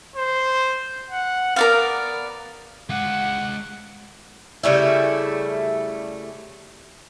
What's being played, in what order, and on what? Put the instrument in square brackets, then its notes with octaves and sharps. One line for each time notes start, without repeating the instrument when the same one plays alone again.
[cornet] C5
F#5
[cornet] B3 [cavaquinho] A#4 D5 F5
[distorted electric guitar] G#3 F5 [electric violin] F#5
[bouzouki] C#3 G3 A3 E4